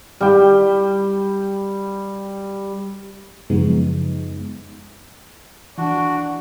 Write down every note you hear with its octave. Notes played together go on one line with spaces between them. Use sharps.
G3 G5
F#2 C#3 F3 G#3 B3 D#4
E3 D4 F#4